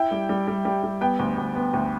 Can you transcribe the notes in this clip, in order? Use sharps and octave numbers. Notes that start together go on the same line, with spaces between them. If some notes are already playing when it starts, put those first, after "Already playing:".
Already playing: E4 G5
G3
G3
G3
G3
G3
B3 G5
D2
D2
B3
D2